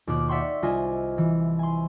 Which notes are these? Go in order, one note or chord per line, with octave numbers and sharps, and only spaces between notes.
D#2 B2 F4 D6 F#6
D5 E5 F#5 G5 C6 C#6
C2 F4 D#5 G#5 G#6 E7
E3
G#5 C6